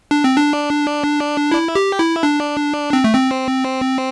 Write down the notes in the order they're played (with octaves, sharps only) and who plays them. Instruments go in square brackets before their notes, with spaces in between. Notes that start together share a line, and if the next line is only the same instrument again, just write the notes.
[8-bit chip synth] D4
C4
D4
E4
G4
E4
D4
C4
A3
C4